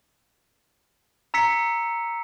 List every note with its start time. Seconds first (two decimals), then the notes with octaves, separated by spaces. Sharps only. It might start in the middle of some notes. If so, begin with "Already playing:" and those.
1.34 A#5 E6 B6 C#7